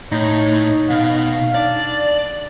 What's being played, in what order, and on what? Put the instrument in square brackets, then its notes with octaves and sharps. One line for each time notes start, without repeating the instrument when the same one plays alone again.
[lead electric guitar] A2 [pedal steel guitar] D#4 [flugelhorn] C#5
[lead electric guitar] B2 [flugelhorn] F5
[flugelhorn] D4 [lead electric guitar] D5